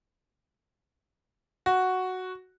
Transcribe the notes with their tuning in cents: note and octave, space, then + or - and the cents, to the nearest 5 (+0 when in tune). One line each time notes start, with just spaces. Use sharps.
F#4 +0